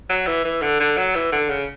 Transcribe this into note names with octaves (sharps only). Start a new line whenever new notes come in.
F#3
E3
E3
D3
D3
F#3
E3
D3
C#3